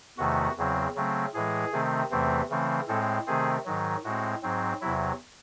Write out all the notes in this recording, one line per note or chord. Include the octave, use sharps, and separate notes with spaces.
E2 C3 D#3 A3 F#4
E2 C#3 F#3 C4
C#3 F#3 A3 C4
A2 E3 G#3 G#4
C3 D#3 A3 C4
E2 C3 E3 A3 C4
C#3 E3 A3 C4
A2 G#3 C4 A4
C3 D#3 A3 C4 G#4
G#2 D#3 F#3
A2 G#3 C4 F#4
G#2 F#3 C4
E2 C3 F#3 E4